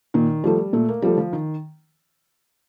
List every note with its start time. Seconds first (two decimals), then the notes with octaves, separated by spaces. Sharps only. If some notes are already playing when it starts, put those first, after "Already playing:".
0.14 A#2 D#3
0.44 F3 G3 A3
0.73 A#2 A3
0.89 A#3
1.02 F3 G3 A3
1.18 F3
1.33 D#3